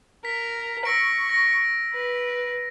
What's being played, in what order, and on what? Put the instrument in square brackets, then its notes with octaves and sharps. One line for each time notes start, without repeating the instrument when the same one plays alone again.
[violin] A#4 [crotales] B6
[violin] C#6 [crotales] E6 A#6 D7
[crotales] A#6
[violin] B4